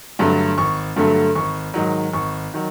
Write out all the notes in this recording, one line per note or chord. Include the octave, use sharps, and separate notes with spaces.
G2 D3 F#3 A3
G#1 C#6
G2 D3 F#3 A3
G#1 C#6
G#2 D#3 F#3
G#1 C#6
D#3 F#3